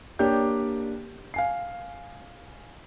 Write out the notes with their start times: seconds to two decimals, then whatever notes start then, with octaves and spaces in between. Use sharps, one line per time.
0.19 A#3 D4 G4 C#5 D5 G6
1.34 F5 G#5 C7